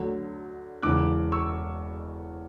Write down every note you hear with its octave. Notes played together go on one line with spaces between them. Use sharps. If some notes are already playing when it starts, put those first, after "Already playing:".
Already playing: D2 D3 F#3
E1 E2 C#3 E3 D6 F#6
C#6 E6